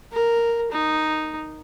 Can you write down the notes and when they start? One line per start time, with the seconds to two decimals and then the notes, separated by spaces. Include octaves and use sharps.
0.12 A#4
0.72 D#4